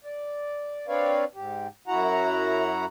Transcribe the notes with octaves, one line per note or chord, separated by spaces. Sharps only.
D5
C4 D4 B4 C#5 D5 F5
G#2 G4
F#2 E4 F#4 F#5 A#5